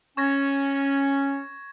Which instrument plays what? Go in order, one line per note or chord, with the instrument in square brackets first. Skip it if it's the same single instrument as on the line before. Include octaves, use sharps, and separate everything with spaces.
[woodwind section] C#4 [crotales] C#6 G#6 A#6